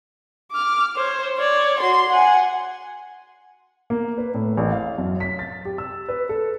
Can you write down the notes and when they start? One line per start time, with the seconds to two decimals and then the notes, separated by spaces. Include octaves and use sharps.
0.51 D6 F6
0.96 C5 C#5
1.38 C#5 D5
1.80 F#4 C6
2.10 F#5 G#5
3.90 A#3
4.18 B4
4.34 A2
4.57 A1
4.72 F5
4.98 F#2
5.20 B6
5.39 A6
5.65 G4
5.78 E6
6.08 B4
6.29 A4